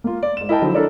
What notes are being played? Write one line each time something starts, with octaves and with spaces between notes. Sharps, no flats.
A#3 F4
D5
G#2 E7
E4 A#4 D#5 G5 A5
D3 F3 F#3 D#4 E4
D4 E4 A4 A#4 C#5 D5